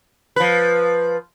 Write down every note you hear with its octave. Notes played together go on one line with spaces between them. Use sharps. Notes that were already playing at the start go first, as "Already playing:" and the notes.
F3 B4